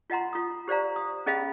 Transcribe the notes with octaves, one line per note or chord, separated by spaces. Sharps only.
F4 D#5 F#5 A#5 C6
F4 D#6
G4 C5 D5 F5 A#5
D#6
C#4 G#4 D#5 F5 B5